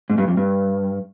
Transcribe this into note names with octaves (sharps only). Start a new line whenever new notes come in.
G#2
G2
F2
G2